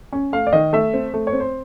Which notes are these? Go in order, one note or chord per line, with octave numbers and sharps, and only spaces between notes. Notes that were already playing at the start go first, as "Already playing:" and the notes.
C#4
A3 F5
D5
D#3 D#5
A3 E5
C4
A3
C#5
C4
C5